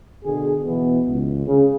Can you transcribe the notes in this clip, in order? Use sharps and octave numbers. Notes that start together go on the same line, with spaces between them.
B2 D3 G#4
B2 E3 B3
C#2
C#3